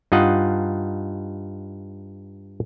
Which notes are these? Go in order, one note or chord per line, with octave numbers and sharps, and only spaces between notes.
G2 D#4 F4 D#5 F#5